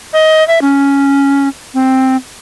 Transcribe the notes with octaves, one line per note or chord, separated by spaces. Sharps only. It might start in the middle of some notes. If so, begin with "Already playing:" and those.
D#5
E5
C#4
C4